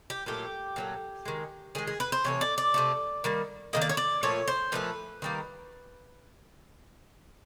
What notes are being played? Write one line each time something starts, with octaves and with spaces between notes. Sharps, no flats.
G4
A#2 F#3 A3 G4
A#2 F#3 A3
D#3 G#3
D#3 G#3 G#4
G#4
B4
C5
C3 E3 A3 C#5
D5
D5
C3 E3 A3
D#3 G3 A#3
D#3 G3 A#3 D#5
D5
C#5
D5
A#2 F3 A3 C#5
C5
A#2 F3 A3 B4
D#3 G3 A#3